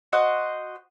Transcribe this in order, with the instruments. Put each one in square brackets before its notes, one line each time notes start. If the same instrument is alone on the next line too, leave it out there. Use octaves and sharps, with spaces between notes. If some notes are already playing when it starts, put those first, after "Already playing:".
[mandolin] F#4 C5 D#5